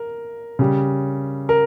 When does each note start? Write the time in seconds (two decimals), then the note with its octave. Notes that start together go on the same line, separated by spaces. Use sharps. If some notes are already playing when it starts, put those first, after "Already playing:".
Already playing: A#4
0.59 C#3 G3
1.49 A#4